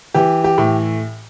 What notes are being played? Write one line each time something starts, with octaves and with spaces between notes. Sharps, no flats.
E3 G4
G4
A2